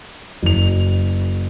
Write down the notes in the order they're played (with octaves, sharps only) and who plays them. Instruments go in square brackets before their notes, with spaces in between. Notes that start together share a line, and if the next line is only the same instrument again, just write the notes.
[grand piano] F#1 F7